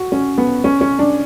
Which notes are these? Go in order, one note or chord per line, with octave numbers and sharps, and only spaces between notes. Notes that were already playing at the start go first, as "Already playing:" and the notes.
Already playing: F#4
C#4
B3
C#4
C#4
D4